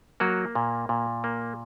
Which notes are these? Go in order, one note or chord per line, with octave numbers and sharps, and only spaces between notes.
F#3 A#3 F#4
A#2
A#2
A#3